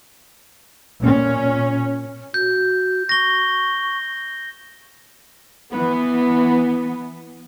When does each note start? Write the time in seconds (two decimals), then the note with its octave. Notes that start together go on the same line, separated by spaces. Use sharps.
1.00 A#2 C#4
2.34 F#4 G6
3.09 C#6 A#6 G7
5.74 E3 B3